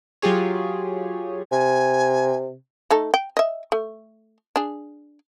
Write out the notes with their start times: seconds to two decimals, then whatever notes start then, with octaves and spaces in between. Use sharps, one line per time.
0.22 F#3 F4 G4 G#4 C#5
1.51 C3 G#5
2.91 A3 D#4 A4
3.14 G5
3.37 D#5 E5
3.72 A3
4.56 D4 G#4